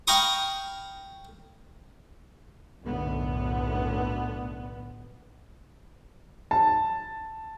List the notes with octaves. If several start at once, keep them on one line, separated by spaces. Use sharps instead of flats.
F5 G5 A#5 B5 C#6 D#6
B1 F#2 A2 D3 B3
A5